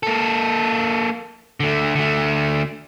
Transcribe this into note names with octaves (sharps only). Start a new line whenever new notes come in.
A#3 A4
D3 A3
D3 A3